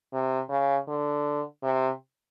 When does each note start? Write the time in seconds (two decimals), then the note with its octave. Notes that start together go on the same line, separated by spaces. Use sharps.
0.13 C3
0.50 C#3
0.88 D3
1.63 C3